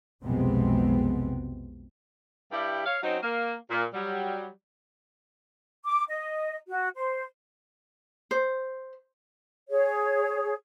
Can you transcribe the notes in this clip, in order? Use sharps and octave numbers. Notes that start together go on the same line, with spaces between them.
B1 F2 C3 G#3 B3 C4
G2 G3 E4 G4
C#5 F5
F#3 C4 C#4 D#4
A#3
A#2
F#3 G3
D6
D#5
F#4
C5
C5
G#4 C#5